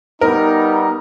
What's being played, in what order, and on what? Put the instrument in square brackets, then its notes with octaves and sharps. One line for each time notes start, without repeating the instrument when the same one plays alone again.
[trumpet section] G3 B3 D#4 [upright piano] A#4